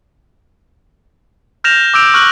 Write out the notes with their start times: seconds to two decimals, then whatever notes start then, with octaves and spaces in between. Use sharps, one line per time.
1.64 F6 G6 A#6 E7 F7
1.94 D6 E6 G6 D7 F7
2.14 C#6 F6 F#6 F#7